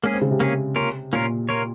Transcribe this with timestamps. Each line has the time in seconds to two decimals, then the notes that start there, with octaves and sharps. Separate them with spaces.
0.03 G#3 A#3 C#4 G#4
0.13 C4
0.21 C#3
0.31 C3
0.40 A#3 C#4 G#4
0.76 A#3 C#4 F4 A#4
1.13 A#2 A#3 C#4 F4 A#4
1.49 A#3 F4 A#4 C#5